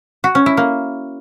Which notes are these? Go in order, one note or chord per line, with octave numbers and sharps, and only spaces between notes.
F#4
C#4
E4
A#3